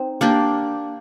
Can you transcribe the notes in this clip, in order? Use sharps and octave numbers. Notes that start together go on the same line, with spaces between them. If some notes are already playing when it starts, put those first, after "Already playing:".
Already playing: C4 D#4
A#3 D4 G4